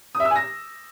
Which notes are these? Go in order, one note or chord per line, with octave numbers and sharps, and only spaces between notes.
D#6
E5
E6
G#5
A#6